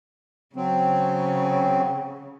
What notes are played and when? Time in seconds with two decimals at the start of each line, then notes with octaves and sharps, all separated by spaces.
0.56 C#3 F#3 C4